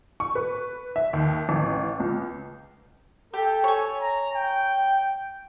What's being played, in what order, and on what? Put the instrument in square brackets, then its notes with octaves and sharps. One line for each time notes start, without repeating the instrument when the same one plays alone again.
[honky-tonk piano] C#6
B4
E5
D#2
A1
C#2
[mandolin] G4 [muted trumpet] A4
[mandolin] C#5 G#5
[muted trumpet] A#5
G5